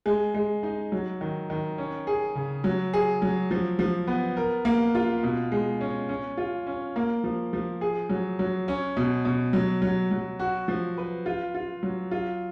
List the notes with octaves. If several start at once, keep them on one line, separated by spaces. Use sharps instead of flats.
G#3
G#3
D#4
F#3
D#3
D#3
C#4
G#4
C#3
F#3
G#4
F#3
F3
F3
B3
A#4
A#3
F4
B2
G#3
C#4
C#4
F4
C#4
A#3
F3
F3
G#4
F#3
F#3
C#4
B2
B2
F#3
F#3
F#3
F#4
F3
B4
F4
F4
F#3
F4